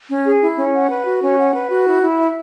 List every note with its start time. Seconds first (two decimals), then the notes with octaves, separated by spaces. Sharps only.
0.09 C#4
0.25 G#4
0.41 E4
0.57 C#4
0.74 F#5
0.90 B4
1.05 F#4
1.22 C#4
1.38 F#5
1.54 B4
1.70 F#4
1.86 E4
2.03 E4
2.19 E5